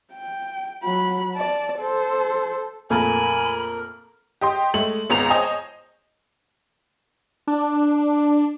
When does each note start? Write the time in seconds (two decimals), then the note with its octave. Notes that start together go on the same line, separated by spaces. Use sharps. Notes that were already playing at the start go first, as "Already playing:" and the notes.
0.12 G5
0.84 F#3 B5
1.35 D5 A5
1.79 A4 C5
2.90 F2 A#2 A3 A#4 G#5 B5
4.41 G4 D#5 C6
4.74 G#3 A3 F#7
5.10 G#1 C#2 B3 A#5 F7
5.30 C5 C#5 D#5 G#5
7.47 D4